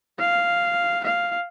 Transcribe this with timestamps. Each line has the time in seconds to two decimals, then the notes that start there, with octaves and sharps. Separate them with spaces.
0.19 F5
1.04 F5